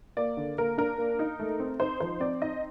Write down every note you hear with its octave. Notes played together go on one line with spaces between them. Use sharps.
A#3 D5
D3
A#3 A#4
D4 A#4
A#3
D#4
A3
C4
D#4 C5
F3 C5
C4 D5
D#4 D#5